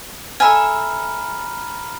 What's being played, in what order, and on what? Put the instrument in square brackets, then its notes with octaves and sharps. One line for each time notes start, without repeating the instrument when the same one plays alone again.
[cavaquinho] A4 E5 G#5 [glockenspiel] A#5 B5 F6